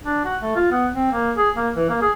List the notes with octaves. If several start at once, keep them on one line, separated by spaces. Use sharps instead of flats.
D4
F#4
A3
F4
B3
C4
A#3
G#4
A#3
E3
A#3
G#4